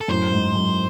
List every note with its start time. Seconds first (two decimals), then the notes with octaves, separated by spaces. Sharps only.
0.01 A4
0.08 F#2 A2 C5
0.32 G#2
0.55 F#2